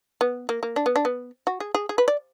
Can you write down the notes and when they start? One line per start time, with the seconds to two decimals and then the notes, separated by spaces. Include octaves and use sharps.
0.21 B3
0.49 A#3
0.63 A#3
0.76 D4
0.86 B3
0.96 D4
1.05 B3
1.47 F#4
1.60 G#4
1.75 G#4
1.89 G#4
1.98 B4
2.08 D5